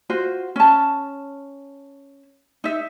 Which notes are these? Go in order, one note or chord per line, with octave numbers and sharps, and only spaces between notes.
F4 F#4 C5
C#4 A5
D#4 E5